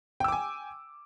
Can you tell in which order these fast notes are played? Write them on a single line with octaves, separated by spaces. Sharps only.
G5 E6 D6 G#5